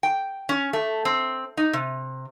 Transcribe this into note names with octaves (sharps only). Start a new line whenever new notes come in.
G5
C#4
A3
C4
D#4
C3